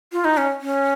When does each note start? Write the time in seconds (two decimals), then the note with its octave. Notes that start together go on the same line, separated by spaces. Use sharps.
0.12 F4
0.25 D#4
0.37 C#4
0.61 C#4